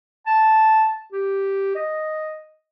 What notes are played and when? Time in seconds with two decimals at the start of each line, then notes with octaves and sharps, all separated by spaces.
0.27 A5
1.12 G4
1.75 D#5